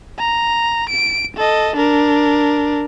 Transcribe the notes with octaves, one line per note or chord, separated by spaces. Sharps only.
A#5
D7
A4 D#5
D4 A#4